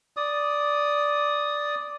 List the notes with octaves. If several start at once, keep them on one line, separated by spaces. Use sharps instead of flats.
D5 D#6